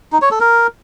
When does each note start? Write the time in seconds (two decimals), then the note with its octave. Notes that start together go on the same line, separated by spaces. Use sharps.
0.12 D#4
0.22 C#5
0.31 A4
0.40 A#4